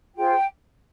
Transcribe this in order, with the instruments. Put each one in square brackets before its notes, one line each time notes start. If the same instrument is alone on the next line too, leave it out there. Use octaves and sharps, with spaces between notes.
[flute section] F4 G#4 C5 G5